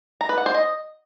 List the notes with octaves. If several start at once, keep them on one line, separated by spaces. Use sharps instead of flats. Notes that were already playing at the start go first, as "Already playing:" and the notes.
A#5
B4
F#5
C5
D#5